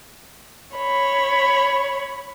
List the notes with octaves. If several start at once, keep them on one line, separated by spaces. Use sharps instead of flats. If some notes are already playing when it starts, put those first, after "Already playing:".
C#5 B5